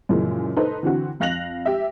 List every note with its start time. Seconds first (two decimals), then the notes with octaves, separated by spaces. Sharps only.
0.09 F#2 A#2 C#3 E3 F3 G#3
0.57 D#4 A4 B4 C5
0.83 D3 E3 C4 F#4
1.20 F2 F5 F#6 A#6 F7 F#7
1.66 G4 E5